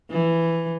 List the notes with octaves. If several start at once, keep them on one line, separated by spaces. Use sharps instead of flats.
E3